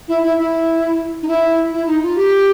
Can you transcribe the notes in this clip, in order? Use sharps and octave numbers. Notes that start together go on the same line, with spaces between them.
E4
E4
E4
D#4
E4
E4
D#4
F4
G4